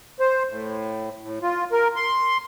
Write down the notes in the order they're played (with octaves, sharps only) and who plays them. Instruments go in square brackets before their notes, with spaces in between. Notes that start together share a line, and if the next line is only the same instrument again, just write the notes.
[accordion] C5
A2
A2
F4
A#4
C6